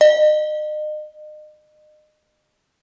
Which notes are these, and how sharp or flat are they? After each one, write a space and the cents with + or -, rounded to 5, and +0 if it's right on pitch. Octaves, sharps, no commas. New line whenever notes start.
D#5 -35